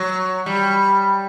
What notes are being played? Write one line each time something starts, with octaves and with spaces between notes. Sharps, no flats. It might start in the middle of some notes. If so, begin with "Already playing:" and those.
Already playing: F#3
G3